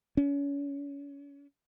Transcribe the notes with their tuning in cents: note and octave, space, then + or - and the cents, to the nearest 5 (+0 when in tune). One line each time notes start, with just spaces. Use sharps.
C#4 +30